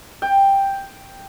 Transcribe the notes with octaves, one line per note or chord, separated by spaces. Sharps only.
G5